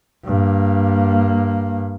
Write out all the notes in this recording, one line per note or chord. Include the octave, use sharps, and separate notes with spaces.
G2 A#3